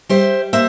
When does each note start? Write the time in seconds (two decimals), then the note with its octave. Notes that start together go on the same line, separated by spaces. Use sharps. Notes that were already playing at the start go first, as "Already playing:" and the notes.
0.09 G3 C5 E5
0.53 A#3 C5 E5